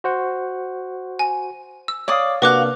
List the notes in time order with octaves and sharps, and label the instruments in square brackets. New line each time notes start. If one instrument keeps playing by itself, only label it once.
[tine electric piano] F#4 C5 F#5
[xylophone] G#5
E6
[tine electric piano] C#5 F5 [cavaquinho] D5 D6 D#6
[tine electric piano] C3 A#3 D4 [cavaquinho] F#4 F5 [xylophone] B4 D6 F#6